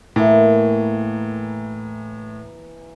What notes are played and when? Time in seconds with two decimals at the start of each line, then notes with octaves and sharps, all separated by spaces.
0.16 A2 E3 A#3